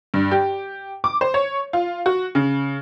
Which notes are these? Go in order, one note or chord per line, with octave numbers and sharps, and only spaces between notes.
G2
G4
D6
C5
C#5
F4
F#4
C#3